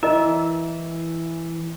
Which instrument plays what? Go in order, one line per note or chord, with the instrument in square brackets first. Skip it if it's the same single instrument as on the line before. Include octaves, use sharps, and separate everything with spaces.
[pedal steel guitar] E3 E5 [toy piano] E4 A#4 D#5